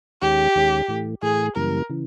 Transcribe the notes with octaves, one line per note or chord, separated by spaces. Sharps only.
D#2 D#3 G#3 C#4 G4
D#2 D#3 G#3 C#4
A2 E3 A3
A2 E3 A3 G#4
F#2 C#3 E3 G3 A#3 A#4
C#3 E3